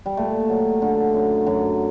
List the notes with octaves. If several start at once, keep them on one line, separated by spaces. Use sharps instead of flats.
G3
A#2 A3
F#3
D3
F#2
F#2